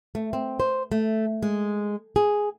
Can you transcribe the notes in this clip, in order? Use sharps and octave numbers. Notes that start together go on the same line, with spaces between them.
A3
C4
C5
A3
G#3
G#4